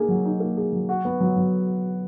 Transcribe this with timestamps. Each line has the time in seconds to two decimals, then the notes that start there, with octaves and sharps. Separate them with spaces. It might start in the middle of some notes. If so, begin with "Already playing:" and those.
Already playing: A#3 D#4 G#4
0.09 F#3
0.25 D#4
0.40 A#3
0.57 G#4
0.73 F#3
0.89 F#4
1.05 B3
1.20 F#3
1.36 F#3